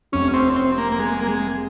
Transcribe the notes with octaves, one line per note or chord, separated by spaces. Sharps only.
F1 F2 C3 C#4
C4
C4
A#3
A#3
G#3
A#3
G#3